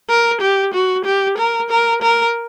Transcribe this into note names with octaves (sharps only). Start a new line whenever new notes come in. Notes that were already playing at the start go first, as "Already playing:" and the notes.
A#4
G4
F#4
G4
A#4
A#4
A#4